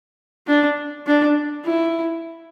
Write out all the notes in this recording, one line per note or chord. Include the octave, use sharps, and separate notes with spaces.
D4
D4
E4